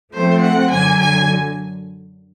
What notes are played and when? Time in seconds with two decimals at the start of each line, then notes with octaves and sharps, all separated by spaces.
0.13 F3 A3 C4 C5
0.41 F#5
0.70 F#2 D3 F#3 G#5
1.00 G#5